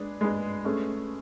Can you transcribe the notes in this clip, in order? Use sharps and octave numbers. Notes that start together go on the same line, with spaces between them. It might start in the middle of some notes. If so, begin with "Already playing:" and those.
Already playing: G#3 D4 G#4 B4
G#3 D4 G#4 B4
A3 C#4 G#4 B4